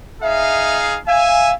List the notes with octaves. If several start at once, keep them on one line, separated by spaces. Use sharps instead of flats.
D#4 G#4 E5 F5
E5 F5 G#5